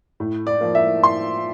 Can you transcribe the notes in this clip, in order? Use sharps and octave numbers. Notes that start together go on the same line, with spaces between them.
A2
D5
F3 A#3
E5
A2 C6